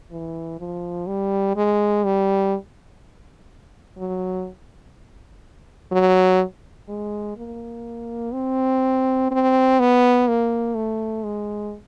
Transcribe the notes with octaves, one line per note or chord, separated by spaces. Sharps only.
E3
F3
G3
G#3
G3
F#3
F#3
G#3
A#3
C4
C4
B3
A#3
A3
G#3